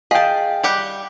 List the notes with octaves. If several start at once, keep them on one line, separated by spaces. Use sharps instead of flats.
G#4 D#5 F5 G5 A5
G3 G4 F#5